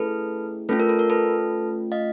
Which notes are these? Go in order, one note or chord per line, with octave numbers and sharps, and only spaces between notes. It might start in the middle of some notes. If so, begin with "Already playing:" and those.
Already playing: A3 C#4 E4 G#4 A4 B4
A3 C#4 F4 A4 B4
A#4
A4
A#4
A4 B4
D#5 F5